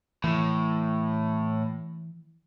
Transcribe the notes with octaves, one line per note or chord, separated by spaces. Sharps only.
A2 E3